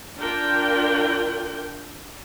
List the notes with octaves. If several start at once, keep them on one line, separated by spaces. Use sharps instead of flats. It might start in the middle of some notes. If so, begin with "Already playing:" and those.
D4 F4 A#4 G5